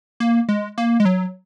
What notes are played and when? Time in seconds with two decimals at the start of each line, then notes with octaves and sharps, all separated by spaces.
0.20 A#3
0.49 G#3
0.78 A#3
1.00 G#3
1.05 F#3